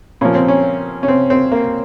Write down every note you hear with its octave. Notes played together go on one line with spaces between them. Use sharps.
A#2 F3 C#4
C4
C#4
C#4
C4
C4
A#3